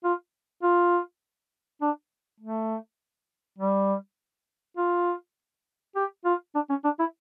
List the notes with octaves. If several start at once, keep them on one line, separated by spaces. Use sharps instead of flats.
F4
F4
D4
A3
G3
F4
G4
F4
D4
C#4
D4
E4